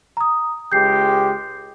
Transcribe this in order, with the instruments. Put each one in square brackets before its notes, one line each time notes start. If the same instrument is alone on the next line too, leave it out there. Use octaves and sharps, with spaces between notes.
[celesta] A#5 D#6
[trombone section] C#2 G#3 G4 [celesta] G6 C7